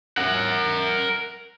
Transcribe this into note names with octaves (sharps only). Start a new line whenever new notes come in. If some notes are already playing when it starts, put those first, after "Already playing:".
A#4 F#5